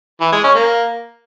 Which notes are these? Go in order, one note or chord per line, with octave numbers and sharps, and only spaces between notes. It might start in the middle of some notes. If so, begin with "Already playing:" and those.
E3
G#3
C#4
A#3